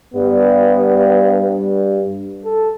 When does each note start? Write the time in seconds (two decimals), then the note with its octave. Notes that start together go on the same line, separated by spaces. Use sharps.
0.14 G2 B3
2.45 A4